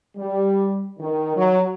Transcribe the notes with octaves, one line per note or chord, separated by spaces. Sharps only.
G3
D#3
F#3